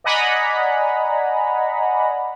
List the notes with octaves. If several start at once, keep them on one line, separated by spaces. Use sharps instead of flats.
D5 D#5 F#5 G#5 A#5 B5